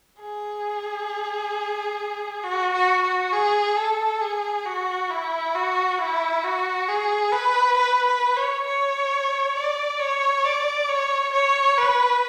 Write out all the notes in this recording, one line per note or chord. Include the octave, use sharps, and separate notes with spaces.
G#4
F#4
F#4
F#4
G#4
A4
G#4
F#4
E4
F#4
E4
F#4
G#4
B4
B4
B4
C#5
C#5
D5
C#5
D5
C#5
C#5
B4